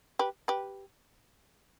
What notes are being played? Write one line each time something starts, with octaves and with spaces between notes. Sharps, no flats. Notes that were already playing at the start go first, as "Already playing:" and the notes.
G4 B4
G4 B4